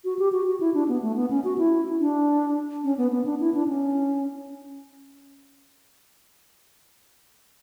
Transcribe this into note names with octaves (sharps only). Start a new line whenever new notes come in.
F#4
G4
F#4
F#4
E4
D4
B3
A3
B3
C#4
F#4
E4
D4
C#4
B3
B3
D4
E4
D4
C#4